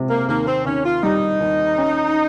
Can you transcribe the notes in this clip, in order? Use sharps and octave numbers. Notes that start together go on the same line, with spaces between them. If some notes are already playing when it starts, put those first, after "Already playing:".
Already playing: C3 G#3
A#3
D#2 A#3
C4
D#2 C#4
F4
G3 D#4
D#2
C#4